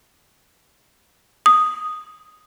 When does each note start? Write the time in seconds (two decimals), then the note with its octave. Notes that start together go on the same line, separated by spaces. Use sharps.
1.46 D#6